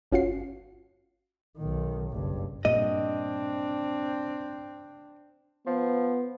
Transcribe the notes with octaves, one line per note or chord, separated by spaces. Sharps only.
G1 C#4 F4 F#4 C7
B1 D#3
F#1 G2
G2 A#2 C4 D4 D#5
F3 B3